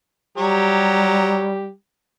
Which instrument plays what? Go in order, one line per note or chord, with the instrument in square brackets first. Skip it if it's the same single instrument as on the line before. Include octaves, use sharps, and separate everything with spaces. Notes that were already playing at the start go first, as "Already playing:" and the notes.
[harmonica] F#3 C#5 A#5 [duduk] G3 [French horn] G4